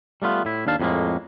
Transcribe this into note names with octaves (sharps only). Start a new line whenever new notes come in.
G3 A3 B3 F4
A2 E4
D#2 D4 F5 A5
F2 A2 G3 G#3 A#3